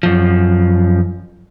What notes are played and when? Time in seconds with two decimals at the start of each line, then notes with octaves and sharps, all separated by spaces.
0.03 F#2 F3